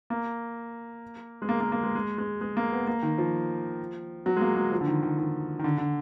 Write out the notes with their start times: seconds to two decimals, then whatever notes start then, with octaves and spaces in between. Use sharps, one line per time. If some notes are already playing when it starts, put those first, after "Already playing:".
0.10 A#3
1.42 G#3
1.49 A#3
1.60 A#3
1.72 A#3
1.83 G#3
1.95 G#3
2.18 G#3
2.41 G#3
2.57 A#3
2.72 B3
2.87 A#3
3.03 D#3
3.18 F3
4.26 F#3
4.37 G#3
4.41 A#3
4.56 G#3
4.72 F3
4.81 D3
4.87 D#3
5.03 D#3
5.18 D#3
5.59 D#3
5.64 D3
5.78 D3